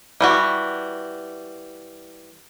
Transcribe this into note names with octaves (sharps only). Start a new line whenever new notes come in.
E3 G3 F#4